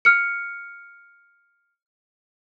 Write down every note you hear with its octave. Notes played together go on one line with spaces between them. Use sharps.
F6 C#7